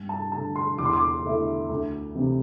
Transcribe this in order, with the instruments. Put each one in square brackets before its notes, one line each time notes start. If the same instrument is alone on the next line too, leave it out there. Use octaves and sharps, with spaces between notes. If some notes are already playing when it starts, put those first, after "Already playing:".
Already playing: [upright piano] G2
A5
D3 A3 A5
C6
E2 D6
C6
D6
D3 A3 E4
D2
C3 E3 C4 E4